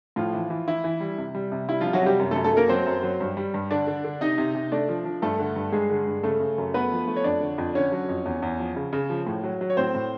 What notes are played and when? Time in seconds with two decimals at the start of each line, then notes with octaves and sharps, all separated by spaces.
0.16 A2 F3 F4
0.33 E3
0.50 E3
0.68 E3 E4
0.84 E3
1.00 G3
1.18 C3
1.35 G3
1.52 C3
1.68 G3 E4
1.81 C3 F3 F4
1.93 F#3 F#4
2.02 C3 G3 G4
2.19 F#2
2.31 A3 A4
2.36 F#2
2.44 A3 A4
2.53 F#2 A#3 A#4
2.69 F#3 C4 C5
2.86 F#2
3.03 F#3
3.20 G2
3.37 G3
3.54 G2
3.70 D3 D4 D5
3.87 D3
4.04 D3
4.21 C3 D#4 D#5
4.38 C3
4.55 C3
4.72 A3 D4 D5
4.89 F3
5.05 F3
5.22 G2 A3 A4
5.39 D3
5.56 G2
5.72 G2 G#3 G#4
5.90 D3
6.07 G2
6.23 C#3 A3 A4
6.40 C#3
6.58 F#2
6.74 A3 B3 B4
6.91 F3
7.08 A3
7.16 C#5
7.24 F2 D4 D5
7.41 D3
7.58 F2
7.75 D3 C#4 C#5
7.92 F#3
8.09 F2
8.26 E2
8.42 E2
8.59 F3
8.76 C#3
8.93 C#3
9.10 F3
9.27 A2
9.43 F#3
9.61 F#3
9.70 C#5
9.77 A2 C4 C5
9.95 A2